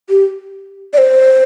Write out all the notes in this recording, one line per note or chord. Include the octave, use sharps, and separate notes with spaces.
G4
D5
C5